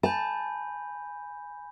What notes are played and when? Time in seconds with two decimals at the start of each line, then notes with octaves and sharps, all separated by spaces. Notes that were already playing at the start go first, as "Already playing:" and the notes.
0.03 G#5 A5 B5 G6